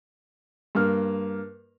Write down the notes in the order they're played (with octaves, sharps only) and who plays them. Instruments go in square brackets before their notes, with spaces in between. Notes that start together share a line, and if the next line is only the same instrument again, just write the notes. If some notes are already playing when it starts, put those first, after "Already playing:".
[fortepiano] G2 A#3 F6